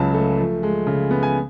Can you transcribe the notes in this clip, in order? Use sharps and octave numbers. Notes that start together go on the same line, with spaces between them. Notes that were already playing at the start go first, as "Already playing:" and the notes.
Already playing: C#2 C#3 F#3 A5
A3
F3
G#3
C#3
B3
G#5